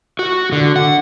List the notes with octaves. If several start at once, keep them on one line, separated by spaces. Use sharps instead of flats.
F#4
D3
F#5